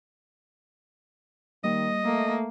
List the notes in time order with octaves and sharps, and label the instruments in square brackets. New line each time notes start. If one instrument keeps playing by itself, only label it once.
[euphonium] D#3 [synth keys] G3 A#3 [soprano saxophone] D#5
[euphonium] A3 [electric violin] A#3 [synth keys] E5